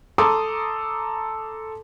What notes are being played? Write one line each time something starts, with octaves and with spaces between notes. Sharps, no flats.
A4 A#5 C6 D6 D#6